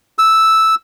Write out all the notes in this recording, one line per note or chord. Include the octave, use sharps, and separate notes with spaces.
E6